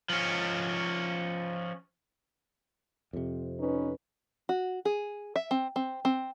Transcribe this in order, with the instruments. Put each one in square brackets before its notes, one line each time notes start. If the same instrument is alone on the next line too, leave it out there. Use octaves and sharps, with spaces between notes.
[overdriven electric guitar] F3 C#4
[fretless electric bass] F2 C3
[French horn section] C#4 D#4 B4
[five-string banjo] F#4
G#4
E5
C4
C4
C4